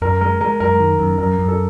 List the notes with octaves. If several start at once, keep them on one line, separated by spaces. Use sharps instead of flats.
F#2 A#4
G#3 A#4
G#3 A#4
F#2 A#4
D#3
F#2
F#2 A#4
F#2
A4